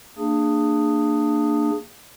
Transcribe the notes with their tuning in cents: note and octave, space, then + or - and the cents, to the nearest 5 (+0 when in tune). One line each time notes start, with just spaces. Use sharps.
A#3 -25 D4 +20 G#4 -5